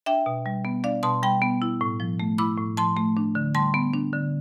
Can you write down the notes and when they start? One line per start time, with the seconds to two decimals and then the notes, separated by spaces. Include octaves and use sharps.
0.06 D4 E5 G5
0.26 B2
0.46 G3
0.65 B3
0.84 D4 D5 F5
1.03 B2 A5 C6
1.23 G3 G5 B5
1.42 B3
1.62 E4
1.81 A2
2.00 F3
2.20 A3
2.38 E4 B5 D6
2.58 A2
2.77 F3 A5 C6
2.97 A3
3.17 D4
3.35 D3
3.55 G3 A5 C6
3.74 B3
3.93 D4
4.13 D3